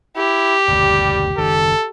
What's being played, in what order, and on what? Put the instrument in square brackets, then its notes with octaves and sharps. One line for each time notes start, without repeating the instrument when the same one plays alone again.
[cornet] E4 [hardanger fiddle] G4
[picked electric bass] F#1 D2 [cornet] G3
[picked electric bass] F#1 C2 D#3 [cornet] A4